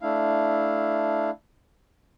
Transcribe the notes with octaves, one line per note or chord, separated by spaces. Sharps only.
A3 D4 E4 F5